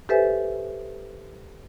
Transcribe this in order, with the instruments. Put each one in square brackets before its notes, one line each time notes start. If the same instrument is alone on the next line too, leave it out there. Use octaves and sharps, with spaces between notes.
[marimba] G4 A4 B4 C5 E5 G#5